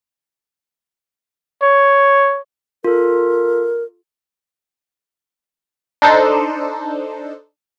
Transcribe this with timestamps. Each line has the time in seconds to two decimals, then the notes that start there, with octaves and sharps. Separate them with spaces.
1.63 C#5
2.84 F4 A4 A#4
6.02 D4 D#4 A4 C5